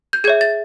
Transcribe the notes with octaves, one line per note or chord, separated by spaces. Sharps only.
G6
G#4 C#5 E5 G#6
A6